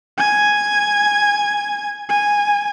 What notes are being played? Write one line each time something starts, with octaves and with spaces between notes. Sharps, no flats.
G#5 G#6
G#5